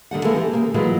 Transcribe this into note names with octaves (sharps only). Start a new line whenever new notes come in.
D3 D#3 G3 F#5
E3 G#3 A#3 A4 A#4
G4
C#3 A#3
E3 F#3 G#3 A#3 E4 F4